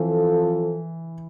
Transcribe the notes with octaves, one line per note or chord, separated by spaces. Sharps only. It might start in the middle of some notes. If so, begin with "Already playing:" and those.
Already playing: E3 F3 C4 F4 A4